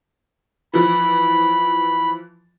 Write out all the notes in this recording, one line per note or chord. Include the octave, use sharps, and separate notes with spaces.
E3 F3 B5